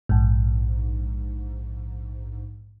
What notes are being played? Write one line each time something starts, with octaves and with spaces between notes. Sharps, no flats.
A#1 G#2